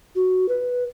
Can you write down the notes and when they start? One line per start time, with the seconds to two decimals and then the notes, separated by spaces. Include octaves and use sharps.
0.15 F#4
0.48 B4